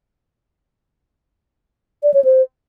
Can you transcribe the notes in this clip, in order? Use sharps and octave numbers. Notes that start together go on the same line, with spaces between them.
D5
C#5
C5